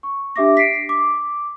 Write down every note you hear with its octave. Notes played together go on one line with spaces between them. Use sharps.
C#6
D4 G4 E5 D6 A#6
B6 C7 D7
D6